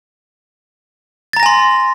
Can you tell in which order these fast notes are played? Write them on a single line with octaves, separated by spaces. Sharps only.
A6 A#5 A#6 G#5 C6